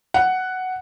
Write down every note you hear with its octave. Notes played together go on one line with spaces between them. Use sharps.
F#5